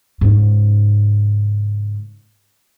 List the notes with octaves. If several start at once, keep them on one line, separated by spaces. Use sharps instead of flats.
G#2 C#3